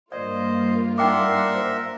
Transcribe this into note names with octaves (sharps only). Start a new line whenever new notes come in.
G2 A#3 F4 C5 D5 D#5
D4 D#4 A#4 E5 F#5 G5 C6 D6
C5